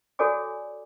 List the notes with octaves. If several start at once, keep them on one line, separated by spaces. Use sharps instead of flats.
F#4 A4 C#5 D5 G#5 D6